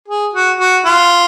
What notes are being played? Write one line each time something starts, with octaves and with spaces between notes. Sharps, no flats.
G#4
F#4
F#4
F4